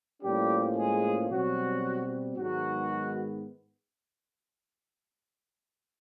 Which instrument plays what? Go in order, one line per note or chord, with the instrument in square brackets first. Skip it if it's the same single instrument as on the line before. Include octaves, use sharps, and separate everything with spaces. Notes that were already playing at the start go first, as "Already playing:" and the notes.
[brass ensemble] A2 F3 G3 A#3 C#4 G4
G#3 G#4
B2 F#3 G3 C4 F#4
G#2 D#3 F#3 G#3 B3 F#4